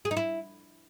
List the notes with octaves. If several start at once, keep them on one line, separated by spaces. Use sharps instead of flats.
G#4
D#4
E4